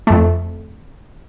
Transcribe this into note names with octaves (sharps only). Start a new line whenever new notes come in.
F2 A3